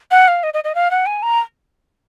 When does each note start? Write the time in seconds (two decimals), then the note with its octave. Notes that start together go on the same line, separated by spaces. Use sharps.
0.11 F#5
0.28 F5
0.43 D#5
0.54 D#5
0.64 D#5
0.75 F5
0.91 F#5
1.06 G#5
1.23 A#5